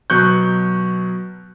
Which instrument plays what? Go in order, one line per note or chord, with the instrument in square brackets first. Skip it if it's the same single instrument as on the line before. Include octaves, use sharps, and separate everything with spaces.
[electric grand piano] B2 F#3 C#6 F#6 G6